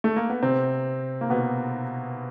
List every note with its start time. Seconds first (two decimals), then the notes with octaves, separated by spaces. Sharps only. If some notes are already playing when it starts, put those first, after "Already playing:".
0.04 A3
0.16 A#3
0.30 B3
0.42 C3 C4
1.21 A#3
1.30 B2 B3